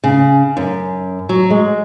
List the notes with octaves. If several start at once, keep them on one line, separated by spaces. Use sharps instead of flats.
C#3
F#2
F#3
G#3